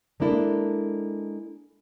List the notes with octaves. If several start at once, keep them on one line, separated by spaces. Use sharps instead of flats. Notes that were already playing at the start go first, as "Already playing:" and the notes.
G#3 A#3 D4 E4 A4